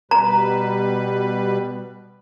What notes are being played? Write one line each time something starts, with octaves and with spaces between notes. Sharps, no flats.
B2 G3 B4 A#5